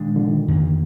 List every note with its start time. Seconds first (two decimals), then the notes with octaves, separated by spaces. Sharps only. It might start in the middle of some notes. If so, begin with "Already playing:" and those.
Already playing: A#2 D#3 G#3 D4
0.16 D3 F3
0.26 D#3
0.48 F2 D#3 A#3